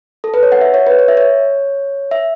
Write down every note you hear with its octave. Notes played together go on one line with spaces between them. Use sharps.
A4
B4
C#5
F#5
E5
C#5
B4
C#5
E5
C#5
E5